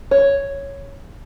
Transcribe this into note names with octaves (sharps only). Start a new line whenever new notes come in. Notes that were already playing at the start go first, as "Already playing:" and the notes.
C#5